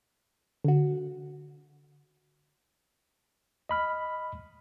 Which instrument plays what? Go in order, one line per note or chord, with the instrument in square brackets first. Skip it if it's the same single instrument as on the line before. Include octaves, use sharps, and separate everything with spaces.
[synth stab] D3 F#4
[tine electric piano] D#5 B5 F6